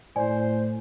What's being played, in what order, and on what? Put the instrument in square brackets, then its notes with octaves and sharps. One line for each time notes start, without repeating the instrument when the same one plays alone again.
[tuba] A2 [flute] C5 [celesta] D5 G#5